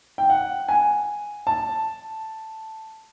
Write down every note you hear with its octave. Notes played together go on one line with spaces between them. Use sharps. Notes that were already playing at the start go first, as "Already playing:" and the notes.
G5
F#5
G#5
A5